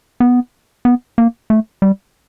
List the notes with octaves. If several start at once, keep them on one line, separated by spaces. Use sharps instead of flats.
B3
B3
A#3
A3
G3